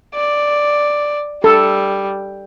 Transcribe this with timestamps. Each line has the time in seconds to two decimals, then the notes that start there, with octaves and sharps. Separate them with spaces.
0.14 D5
1.44 G3 A4